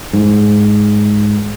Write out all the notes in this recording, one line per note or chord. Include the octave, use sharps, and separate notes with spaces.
G#2